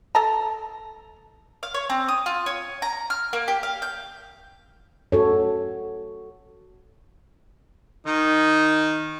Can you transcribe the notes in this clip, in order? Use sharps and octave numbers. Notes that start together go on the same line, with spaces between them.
A4 A5 A#5
F5
C#5
C4
D#6
F4
C#5
A#5
F6
A#3
G4
F5
G6
F#4 A4 C#5
D#3 D#4